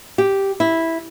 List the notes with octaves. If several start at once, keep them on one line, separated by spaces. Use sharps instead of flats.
G4
E4